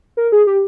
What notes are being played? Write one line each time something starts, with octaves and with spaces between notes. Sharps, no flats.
A#4
G#4
G4